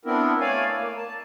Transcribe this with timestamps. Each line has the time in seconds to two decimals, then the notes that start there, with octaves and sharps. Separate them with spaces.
0.05 B3 C4 D4 E4 A#4
0.41 A3 C#5 D5 F5 G#5
0.78 A#3
0.96 A5